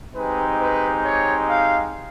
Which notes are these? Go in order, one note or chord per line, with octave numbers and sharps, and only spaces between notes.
G#3 C4 D#4 G4 B4
B4
C#5
F5